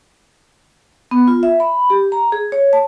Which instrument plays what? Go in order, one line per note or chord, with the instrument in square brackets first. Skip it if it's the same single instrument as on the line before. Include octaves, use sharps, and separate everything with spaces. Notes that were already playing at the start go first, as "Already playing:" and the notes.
[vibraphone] B3
F4
E5
B5
G4
A#5
G#4
C#5
A5